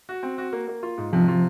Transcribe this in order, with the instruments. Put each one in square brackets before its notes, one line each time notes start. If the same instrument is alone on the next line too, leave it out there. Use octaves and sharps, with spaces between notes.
[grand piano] F#4
C4
F#4
A#3
A#3
F4
G#2
[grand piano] C3 [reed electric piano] F3
[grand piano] F4